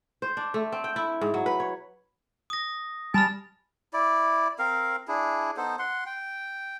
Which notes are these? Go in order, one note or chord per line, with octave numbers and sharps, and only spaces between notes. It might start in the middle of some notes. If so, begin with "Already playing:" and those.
C5
D4
A3
C4
G5
E4
G#2
F#3
B4
C#5
D#6 A#6
G3 G#5 A5 B5 F6
E4 D5
C4 A#4 F5
D4 E4 G#4
B3 D#4 A4 C5
F#5 C6
G5